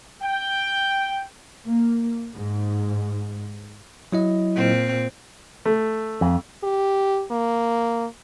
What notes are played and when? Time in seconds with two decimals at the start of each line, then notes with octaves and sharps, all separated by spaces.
0.21 G5
1.66 A#3
2.34 G#2
4.12 F#3 E4 D#5
4.56 A#2 C4
5.66 A3
6.21 F2
6.64 G4
7.31 A#3